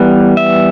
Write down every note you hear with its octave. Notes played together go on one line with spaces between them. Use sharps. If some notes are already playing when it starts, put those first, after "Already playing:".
Already playing: E3 G3 B3
E5